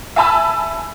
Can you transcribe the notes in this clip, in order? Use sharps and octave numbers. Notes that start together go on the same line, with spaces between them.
E5 G#5 A5 B5 E6